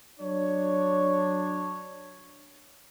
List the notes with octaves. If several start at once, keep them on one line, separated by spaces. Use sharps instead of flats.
F#3 D4 C#5